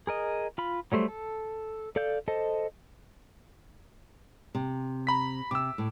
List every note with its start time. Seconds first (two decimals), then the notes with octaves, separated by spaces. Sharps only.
0.07 G#4 A#4 D#5
0.58 F4 B5
0.92 F#3 G3 A3 C5
1.08 A4
1.96 A4 D5 F5 G6
2.28 A4 C5 D#5 A5
4.55 C3
5.07 A#5 B5 B6
5.51 C3 D6 E6
5.78 A2